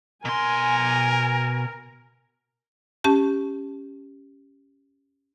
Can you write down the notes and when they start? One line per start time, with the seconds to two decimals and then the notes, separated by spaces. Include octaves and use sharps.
0.25 B2 A#4 G#5 C6
3.04 C#4 G4 A5